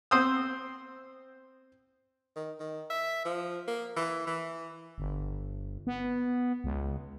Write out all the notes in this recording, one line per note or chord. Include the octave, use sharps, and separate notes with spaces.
C4 C5 D#6 E6
D#3
D#3
E5
F3
A#3
E3
E3
G1
B3
C#2